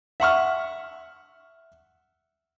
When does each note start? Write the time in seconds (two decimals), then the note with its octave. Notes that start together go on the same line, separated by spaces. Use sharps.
0.20 E5 F#5 C#6 F6